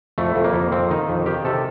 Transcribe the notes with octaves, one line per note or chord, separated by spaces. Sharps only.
F2 A3
F2
A#3
F2
F2 C4
D#3 D#4
F2
D#3 G4
C3 A4